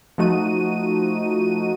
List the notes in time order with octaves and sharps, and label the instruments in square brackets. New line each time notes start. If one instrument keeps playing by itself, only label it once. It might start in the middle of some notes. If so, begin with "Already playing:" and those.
[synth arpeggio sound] F3 A3 D#4 F#4 D#7